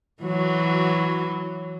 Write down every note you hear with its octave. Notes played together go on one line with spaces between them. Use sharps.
E3 F#3 F#4